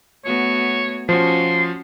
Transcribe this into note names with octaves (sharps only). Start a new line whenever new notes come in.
A3 B3 F#4 C#5
F3 C#4 F#4 C6